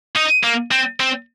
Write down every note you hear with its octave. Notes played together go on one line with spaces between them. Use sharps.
D#4
A#3
C4
C4